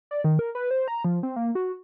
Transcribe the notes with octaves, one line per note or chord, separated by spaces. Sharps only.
D5
D#3
A#4
B4
C5
A#5
F3
C4
A#3
F#4